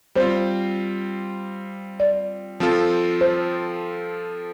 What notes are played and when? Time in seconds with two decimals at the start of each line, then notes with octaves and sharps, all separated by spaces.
0.15 G3 C4 F4 C5
2.00 D5
2.60 F3 C4 F4 A4
3.21 C5